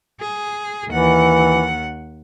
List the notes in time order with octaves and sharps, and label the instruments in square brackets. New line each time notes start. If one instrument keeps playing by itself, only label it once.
[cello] G#4
[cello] D#2 F#5 [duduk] E3